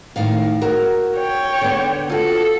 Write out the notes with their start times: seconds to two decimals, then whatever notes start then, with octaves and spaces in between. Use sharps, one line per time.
0.16 A2 D#3 F5
0.62 F#4 A#4
1.17 C#5 G5
1.61 D3 B3
2.10 F4 F#4 A4